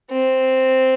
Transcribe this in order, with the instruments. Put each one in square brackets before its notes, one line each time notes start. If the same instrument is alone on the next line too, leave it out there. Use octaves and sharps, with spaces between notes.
[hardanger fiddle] C4